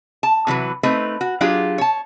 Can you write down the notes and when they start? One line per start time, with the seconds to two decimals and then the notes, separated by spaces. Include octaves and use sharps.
0.23 A5
0.47 C3 E3 F#3 B4
0.83 A3 C4 D#4 B4
1.21 F#4
1.41 F#3 D4 F4 G4 G#4
1.78 C#5 A5